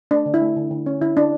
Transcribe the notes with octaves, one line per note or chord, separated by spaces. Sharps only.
A3 D4
D3
E4
A3
D3
D3
C#4
D3 E4
D3 D4